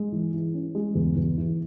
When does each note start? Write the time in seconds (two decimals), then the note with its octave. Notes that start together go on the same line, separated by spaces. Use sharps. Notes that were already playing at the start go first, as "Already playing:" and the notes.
Already playing: G#3
0.12 E3
0.34 E3
0.54 C#4
0.75 G#3
0.95 E2
1.16 E2
1.38 E3